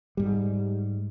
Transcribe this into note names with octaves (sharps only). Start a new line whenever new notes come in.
G#2 G3